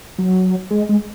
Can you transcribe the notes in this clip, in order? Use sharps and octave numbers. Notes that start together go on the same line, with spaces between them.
F#3
G#3
G#3